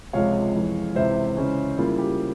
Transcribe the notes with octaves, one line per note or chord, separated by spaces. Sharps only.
C#2 C3 F3 G#3 C#5 F5
F2 E3 G#3
C#2 C3 E3 C5 E5
C#3 E3 G#3 C#4
C#3 G3 A#3 E4 F4
G4